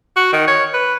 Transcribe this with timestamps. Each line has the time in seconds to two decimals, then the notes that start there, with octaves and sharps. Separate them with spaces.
0.16 F#4
0.33 D#3
0.48 C#5
0.74 B4